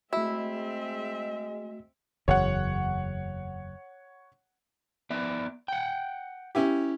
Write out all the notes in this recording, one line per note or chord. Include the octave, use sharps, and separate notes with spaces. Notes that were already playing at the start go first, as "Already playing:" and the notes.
G#3 A3 C4 E4 F#4 D#5 E5
F#1 E2 C#5 F#5
B3 D5 E5
F#5 G5
C#4 E4 G4